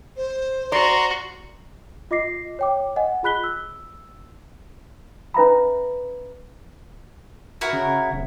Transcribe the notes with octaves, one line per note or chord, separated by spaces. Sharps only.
C5
F#4 D5 A#5 C6
F4 D#5 D6 A#6 C7
C#5 G5 D6
D#5 F#5 G#5
F4 G#4 B5 F#6 B6 G7
E6
C#4 B4 E5 A#5 B5
E4 F#4 A#4
C#3
D1